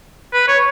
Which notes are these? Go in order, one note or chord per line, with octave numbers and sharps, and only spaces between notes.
B4
C#5